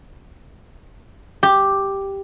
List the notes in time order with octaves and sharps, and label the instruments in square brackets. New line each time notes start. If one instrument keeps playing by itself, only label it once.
[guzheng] G4